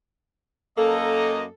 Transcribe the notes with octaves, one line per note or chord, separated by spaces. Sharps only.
F#2 A#3 A4 D#5